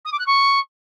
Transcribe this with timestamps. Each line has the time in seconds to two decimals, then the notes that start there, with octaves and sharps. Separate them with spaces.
0.05 D#6
0.12 D6
0.19 F#6
0.26 C#6